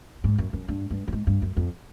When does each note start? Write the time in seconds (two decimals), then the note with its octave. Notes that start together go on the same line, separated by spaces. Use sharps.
0.24 G#2
0.38 F#2
0.53 F#2
0.68 G2
0.91 G2
1.08 G2
1.13 G#2
1.27 G2
1.42 F#2
1.57 F2